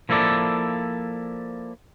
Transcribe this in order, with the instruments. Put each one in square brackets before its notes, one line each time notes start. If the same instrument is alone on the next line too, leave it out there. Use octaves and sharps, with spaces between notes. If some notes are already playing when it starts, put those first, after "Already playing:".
[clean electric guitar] F3 A#3 E4 A4 D5